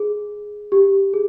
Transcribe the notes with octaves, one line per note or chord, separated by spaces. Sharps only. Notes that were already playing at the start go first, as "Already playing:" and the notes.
Already playing: G#4
G4
G#4